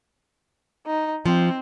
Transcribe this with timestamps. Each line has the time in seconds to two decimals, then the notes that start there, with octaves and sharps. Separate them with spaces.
0.87 D#4
1.26 F3 C4